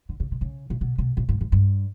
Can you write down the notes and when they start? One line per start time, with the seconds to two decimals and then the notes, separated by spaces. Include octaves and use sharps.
0.09 D3
0.20 C#3
0.31 C3
0.41 C#3
0.70 A#2
0.81 B2
0.98 B2
1.17 A#2
1.29 G#2
1.41 G#2
1.52 G2